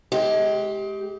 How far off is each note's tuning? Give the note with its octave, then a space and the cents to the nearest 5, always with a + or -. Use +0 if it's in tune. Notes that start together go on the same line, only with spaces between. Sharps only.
G#3 +30 G4 +0